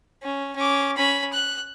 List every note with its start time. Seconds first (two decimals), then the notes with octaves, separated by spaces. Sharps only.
0.23 C#4
0.56 C#4 D6
0.97 C#4 B5
1.33 F#6